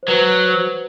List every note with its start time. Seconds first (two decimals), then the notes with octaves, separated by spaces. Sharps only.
0.03 C5
0.08 F#3 B4
0.45 C5